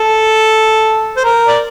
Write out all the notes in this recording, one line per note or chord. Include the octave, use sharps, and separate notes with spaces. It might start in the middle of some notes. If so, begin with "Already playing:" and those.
Already playing: A4
C5
A#4
D5